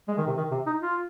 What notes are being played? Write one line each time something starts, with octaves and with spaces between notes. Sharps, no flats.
G#3
D#3
C3
D#3
C3
D#4
F4